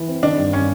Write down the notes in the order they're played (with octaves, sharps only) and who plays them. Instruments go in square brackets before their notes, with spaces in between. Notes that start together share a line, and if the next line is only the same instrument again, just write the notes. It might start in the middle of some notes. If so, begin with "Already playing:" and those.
Already playing: [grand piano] E3
C4
[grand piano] D#3 [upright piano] D4
[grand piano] G2
[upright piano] C#4